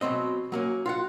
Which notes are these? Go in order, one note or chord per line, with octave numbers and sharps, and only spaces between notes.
B2 F#3 C4 D#5
F#3 A#3 C#4
F4 F#4 F#5